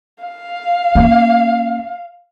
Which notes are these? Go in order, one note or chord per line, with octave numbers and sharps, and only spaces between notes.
F5
A#3 C#4